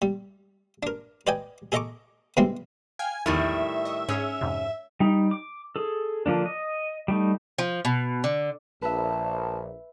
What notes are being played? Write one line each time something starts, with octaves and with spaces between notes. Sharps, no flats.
G3
D4 A#4
B4 D5 D#5 G5 G#5
G#4 A4 D#5 A#5 C#6 D6
B2 D3 G3 G#3 C4 E4
F5 G5 G#5 F6
A#1 E2 A2 D#3 G3 E5
D#5 C#6 D#6
G#2 C#4 G#4 C#5
F2 G#2 C3
G3 D#4
D6
G#4 A4
D3 F3 A#3 D4
D#5
G3 A3 D#4
F3
B2
D3
A#1 B4 E5 A5